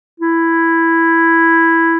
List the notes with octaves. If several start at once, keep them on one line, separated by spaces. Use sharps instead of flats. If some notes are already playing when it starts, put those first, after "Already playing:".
E4